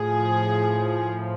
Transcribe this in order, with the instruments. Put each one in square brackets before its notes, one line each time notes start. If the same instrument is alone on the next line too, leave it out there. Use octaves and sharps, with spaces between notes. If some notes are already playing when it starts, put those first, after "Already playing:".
Already playing: [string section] A2 F3 G#4